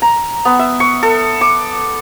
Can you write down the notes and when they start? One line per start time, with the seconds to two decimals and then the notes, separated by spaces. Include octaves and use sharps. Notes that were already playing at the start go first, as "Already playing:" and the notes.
0.02 A#5
0.45 B3
0.59 E5
0.80 C#6
1.03 A4
1.41 D6